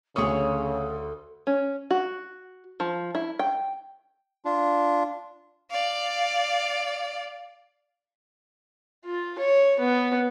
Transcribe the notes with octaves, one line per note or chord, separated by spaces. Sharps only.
D2 C#3 G#4 A4 C#5 D#6
C#4
F#4
F3
E4
G5
D4 F4
D5 F5
F4
C#5
B3